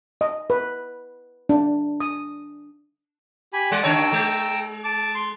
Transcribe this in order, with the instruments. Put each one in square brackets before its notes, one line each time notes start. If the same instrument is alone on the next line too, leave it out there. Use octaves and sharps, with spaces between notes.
[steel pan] D#5
B4
D4
D#6
[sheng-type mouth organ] G4 G#5 B5
[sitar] G3 [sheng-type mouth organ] D5 F#5
[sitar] D#2 C#3 C#5 [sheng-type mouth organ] G5 A#5 E6
[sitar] G#3
[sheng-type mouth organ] A5 D6
C6